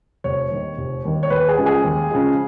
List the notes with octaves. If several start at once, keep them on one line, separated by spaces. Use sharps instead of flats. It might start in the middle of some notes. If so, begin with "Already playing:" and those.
F1 C#5
D#2 D#3
F1
D#2 D#3
C#5
D#2 B4
G#4
C#3 F3 G#3
G#4
D#2
C#3 F3 G#3